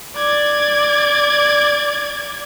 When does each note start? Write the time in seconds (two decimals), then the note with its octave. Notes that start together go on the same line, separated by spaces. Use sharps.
0.17 D5 G#6